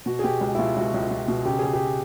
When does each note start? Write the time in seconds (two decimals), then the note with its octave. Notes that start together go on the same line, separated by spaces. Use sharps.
0.06 B2 F#4
0.19 G#4
0.24 B2 G4
0.41 C#2
0.55 E4
0.59 B2 F4
0.76 C#2 F#4
0.94 C#2
1.11 C#2
1.28 B2
1.45 C#3 G4
1.59 C#3 G#4
1.73 G4